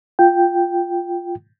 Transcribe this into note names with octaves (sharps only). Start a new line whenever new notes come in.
F4 G5